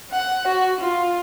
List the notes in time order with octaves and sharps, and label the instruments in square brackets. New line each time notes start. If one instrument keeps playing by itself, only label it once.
[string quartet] F#5
F#4
F4